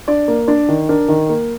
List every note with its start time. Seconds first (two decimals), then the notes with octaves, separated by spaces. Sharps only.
0.08 D4 D5
0.28 A#3
0.48 D4 D5
0.69 D#3
0.89 D4 A#4
1.08 D#3
1.29 A#3